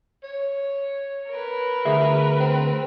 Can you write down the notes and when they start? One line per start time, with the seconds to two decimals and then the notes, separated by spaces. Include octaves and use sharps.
0.23 C#5
1.30 A#4 B4
1.85 D2 G#4 E5
2.40 C4